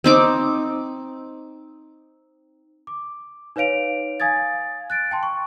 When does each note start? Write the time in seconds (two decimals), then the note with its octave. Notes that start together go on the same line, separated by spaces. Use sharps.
0.04 C4 D#4 D6
2.87 D6
3.56 D#4 B4 C#5 F5 D7 F7
4.20 F5 G#5 D#6 G#6 A6
4.90 F#6 A6 D7
5.11 G5 A5 C6
5.23 C#6